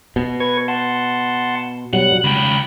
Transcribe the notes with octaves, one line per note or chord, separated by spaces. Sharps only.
B2
B4 C#6 G#6
F#5 A5 C6
B2 F#3 G3 F#5
C#2 G5 B5 F#6